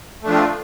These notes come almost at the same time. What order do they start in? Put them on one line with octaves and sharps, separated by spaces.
A3 D4 F3 F4 C4